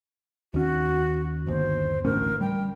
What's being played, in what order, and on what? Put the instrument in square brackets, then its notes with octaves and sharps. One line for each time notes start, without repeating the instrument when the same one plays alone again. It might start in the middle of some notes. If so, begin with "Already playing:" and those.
[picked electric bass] D#2 C#4 [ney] F#4
[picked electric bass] G1 D#2 [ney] C5
[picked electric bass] A1 D2 C#4 [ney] A#4
[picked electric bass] G3 [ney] G5